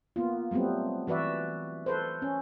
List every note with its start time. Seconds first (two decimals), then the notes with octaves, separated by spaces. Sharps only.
0.16 A#3 B3 F4
0.51 F#3 G3 A3 B3 C4
1.07 E3 F#4 B4 D5 E5
1.86 A4 B4 C5
2.22 C#4